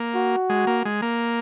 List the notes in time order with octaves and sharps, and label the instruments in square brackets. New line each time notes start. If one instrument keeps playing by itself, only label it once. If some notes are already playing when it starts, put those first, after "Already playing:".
Already playing: [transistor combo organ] A#3
[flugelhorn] F#4
[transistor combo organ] G#3
A#3
G#3
A#3